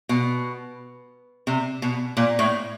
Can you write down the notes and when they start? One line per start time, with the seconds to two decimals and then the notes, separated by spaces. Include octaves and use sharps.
0.09 B2
1.47 C3
1.82 B2
2.17 A#2
2.39 A2